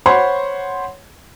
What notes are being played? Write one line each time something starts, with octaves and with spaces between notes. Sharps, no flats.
C5 C#5 F#5 B5 C6